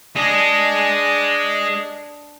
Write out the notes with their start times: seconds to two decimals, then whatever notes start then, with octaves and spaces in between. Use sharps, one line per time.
0.16 D4 G#4 D#5